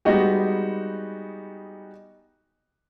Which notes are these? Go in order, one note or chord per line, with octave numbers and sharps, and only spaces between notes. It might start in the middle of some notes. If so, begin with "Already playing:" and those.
G3 G#3 B3 D#4 F#4 G4